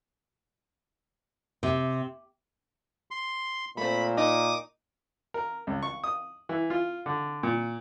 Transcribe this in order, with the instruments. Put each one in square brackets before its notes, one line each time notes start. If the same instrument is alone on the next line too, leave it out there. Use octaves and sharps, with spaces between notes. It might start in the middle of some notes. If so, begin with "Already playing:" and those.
[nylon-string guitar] C3
[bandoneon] C6
[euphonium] A#2 [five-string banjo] A3 C4 [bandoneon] B5
[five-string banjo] D#4 [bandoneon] D6 D#6
[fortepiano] A#4
C#2
C#6
D#6
E3
F4
D3
A#2